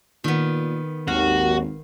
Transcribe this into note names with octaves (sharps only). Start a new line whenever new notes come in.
A#2 D#3 B3
G#1 D#2 F#4 F5